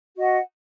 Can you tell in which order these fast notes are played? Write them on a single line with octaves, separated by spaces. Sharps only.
F#4 D#5 F#5